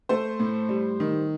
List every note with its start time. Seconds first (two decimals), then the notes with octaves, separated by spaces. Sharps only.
0.09 A3 C5
0.40 A2
0.69 G3
1.00 D#3